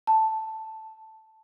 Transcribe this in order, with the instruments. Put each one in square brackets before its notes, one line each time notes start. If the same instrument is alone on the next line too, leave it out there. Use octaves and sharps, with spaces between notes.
[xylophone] A5